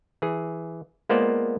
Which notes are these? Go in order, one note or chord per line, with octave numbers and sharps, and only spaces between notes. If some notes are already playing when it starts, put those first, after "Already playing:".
E3 G#4
G#3 A#3 B3 F4 C5 D5